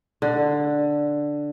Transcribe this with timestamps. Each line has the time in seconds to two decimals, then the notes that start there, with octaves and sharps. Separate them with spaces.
0.22 D3